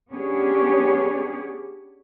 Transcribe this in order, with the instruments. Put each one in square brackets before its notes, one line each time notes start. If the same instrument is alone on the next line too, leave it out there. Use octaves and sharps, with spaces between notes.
[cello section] B3 C#4 D4 G4 G#4 C#5